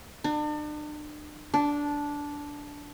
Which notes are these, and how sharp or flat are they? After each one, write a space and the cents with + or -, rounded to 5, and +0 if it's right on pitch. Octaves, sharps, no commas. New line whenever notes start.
D4 +40
D4 -10